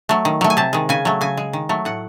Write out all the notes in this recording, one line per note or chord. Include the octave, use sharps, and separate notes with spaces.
F#3 A3
D#3
F#3 A3
G#5
C3 A5
D#3 G#3
C#3 G#5
F#3 A3
C#3 G#5
G#3
D#3
F#3 A3
A2 F#5